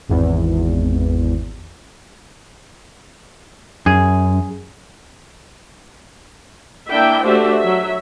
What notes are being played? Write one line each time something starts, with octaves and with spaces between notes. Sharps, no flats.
G#1 E2
F#2 G#4
A#3 D4 E4 E5 G5
A3 D4 F#4 G4 C5 E5
F#3 E5